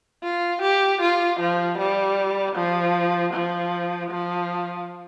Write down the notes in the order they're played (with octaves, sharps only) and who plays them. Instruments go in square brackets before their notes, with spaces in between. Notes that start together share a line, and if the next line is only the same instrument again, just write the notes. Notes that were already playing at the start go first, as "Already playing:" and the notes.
[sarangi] F4
G4
F4
F3
G3
F3
F3
F3